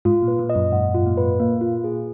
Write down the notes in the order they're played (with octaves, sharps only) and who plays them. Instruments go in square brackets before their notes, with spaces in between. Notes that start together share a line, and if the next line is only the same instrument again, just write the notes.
[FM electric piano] G#2 [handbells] F4
[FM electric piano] A#2
[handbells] B4
[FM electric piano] A#2
[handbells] D#5
[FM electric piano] F#2
[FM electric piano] G#2 [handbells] F#5
[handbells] F4
[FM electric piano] A#2
[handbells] B4
[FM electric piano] A#2 [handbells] A#3
[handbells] F4
G#4